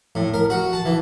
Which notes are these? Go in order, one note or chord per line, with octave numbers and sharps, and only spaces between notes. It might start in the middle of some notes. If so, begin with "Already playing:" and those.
A2
A#4
F#4
A5
E3